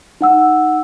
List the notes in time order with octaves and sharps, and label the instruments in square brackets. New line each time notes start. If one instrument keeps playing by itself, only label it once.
[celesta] D#4 F#5 E6